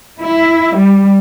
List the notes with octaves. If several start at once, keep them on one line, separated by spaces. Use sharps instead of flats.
E4
G3